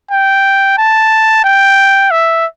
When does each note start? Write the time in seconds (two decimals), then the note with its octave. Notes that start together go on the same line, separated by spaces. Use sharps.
0.11 G5
0.78 A5
1.44 G5
2.11 E5